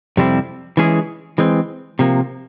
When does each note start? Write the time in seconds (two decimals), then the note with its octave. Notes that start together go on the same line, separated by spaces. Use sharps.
0.17 F2 C3 G3 C4 E4
0.77 E3 G#3 C#4 E4 G#4
1.38 E3 G#3 C4
1.99 C3 F3 A#3